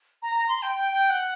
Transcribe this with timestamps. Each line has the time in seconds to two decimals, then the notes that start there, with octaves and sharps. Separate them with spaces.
0.22 A#5
0.35 A#5
0.48 C6
0.62 G5
0.75 G5
0.92 G5
1.10 F#5